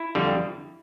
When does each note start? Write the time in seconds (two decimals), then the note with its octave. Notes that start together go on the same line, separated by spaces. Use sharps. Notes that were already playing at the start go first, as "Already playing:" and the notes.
Already playing: E4
0.15 F2 D3 G3